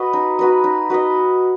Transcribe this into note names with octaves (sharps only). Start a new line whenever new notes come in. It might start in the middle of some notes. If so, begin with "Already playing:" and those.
Already playing: F#4 B4 D#5
D#4
F#4 B4 D#5
D#4
F#4 B4 D#5